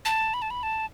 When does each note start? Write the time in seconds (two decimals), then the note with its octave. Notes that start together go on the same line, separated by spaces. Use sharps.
0.05 A5
0.34 B5
0.42 A5
0.51 B5
0.63 A5